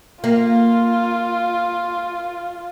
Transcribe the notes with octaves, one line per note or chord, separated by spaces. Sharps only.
A#3 F4